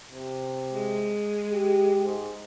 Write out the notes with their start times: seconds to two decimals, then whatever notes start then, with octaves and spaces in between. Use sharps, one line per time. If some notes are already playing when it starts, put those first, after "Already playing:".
0.11 C3
0.70 G#3
1.51 G4
2.04 G#2